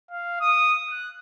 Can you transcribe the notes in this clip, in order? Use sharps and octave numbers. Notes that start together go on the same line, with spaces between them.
F5
D#6
F#6